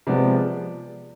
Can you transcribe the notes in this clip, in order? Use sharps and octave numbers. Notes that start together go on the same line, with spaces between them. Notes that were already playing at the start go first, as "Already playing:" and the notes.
C3 F3 G#3 B3 D5